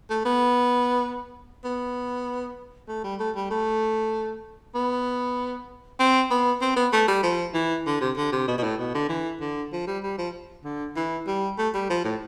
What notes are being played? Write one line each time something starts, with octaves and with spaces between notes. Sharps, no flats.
A3
B3
B3
A3
G3
A3
G3
A3
B3
C4
B3
C4
B3
A3
G3
F3
E3
D3
C3
D3
C3
B2
B2
A2
B2
D3
E3
D3
F3
G3
G3
F3
D3
E3
G3
A3
G3
F3
A2